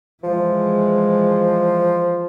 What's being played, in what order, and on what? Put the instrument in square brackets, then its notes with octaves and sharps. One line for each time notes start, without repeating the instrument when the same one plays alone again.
[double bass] E3 G#3 [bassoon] F3